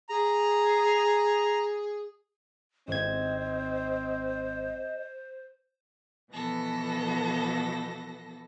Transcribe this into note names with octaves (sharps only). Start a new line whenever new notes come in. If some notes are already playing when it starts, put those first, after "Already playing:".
G#4 A#5
G#1 C4 C5 D#5 G#6
B2 E3 F3 B3 A4 A#6